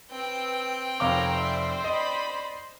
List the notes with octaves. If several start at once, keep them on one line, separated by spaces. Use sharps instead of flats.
C4 B4 G5 E6
F1 A#4 B4 C#5 F5 A#5 D6
C5 D5 E5
D5 D#5 B5